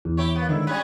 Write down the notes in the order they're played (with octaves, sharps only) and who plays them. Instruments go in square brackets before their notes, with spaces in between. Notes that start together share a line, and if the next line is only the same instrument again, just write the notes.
[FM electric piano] E2
[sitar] E4 G4 C#5
A#3 B3
[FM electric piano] G#2 D3 D#3 [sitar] E4
[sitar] G3 C#4 F#4 [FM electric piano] B4